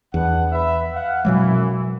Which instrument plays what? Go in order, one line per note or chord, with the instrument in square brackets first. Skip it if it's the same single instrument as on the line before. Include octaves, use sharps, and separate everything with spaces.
[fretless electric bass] E2 [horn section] B3 D4 F#5
[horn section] B4 E5
F5 F#5
[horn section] F#2 E3 [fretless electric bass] B2 F#3 G#3